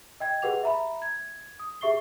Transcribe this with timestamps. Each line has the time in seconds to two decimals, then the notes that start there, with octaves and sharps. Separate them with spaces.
0.20 D#5 G5 G#6
0.42 G4 G#4 B4 F#5 D6 F7
0.63 E5 A#5 B5
1.02 G#6
1.59 D#6
1.81 G4 G#4 E5 C#6 C7 G7